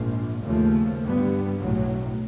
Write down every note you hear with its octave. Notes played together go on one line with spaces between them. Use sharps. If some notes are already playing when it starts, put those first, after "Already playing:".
Already playing: A#1 G#2 F3
D#2 C#3 F3 A3
G2 D3 G3 B3
B1 A2 F#3